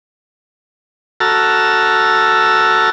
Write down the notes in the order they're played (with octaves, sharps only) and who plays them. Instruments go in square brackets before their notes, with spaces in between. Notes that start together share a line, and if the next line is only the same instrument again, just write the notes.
[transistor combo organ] F#4 A4 A5 A#5 E6 F6